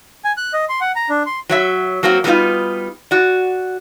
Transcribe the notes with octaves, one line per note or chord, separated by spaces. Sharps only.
G#5
F#6
D#5
C6
F#5
A#5
D4
C6
F#3 C#5 E5
F#3 A#3 C4 F#4
F#3 G3 A3 B3 D#4 F4
F#4 D5